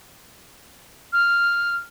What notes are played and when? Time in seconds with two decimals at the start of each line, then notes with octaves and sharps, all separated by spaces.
1.13 F6